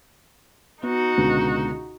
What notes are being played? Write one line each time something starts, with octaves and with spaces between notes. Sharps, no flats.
B3 D#4 F#4
C#2 B2 D3